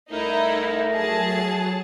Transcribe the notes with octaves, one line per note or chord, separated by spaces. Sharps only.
C2 A3 D#4 E4 A#4
F#3 G#4 A5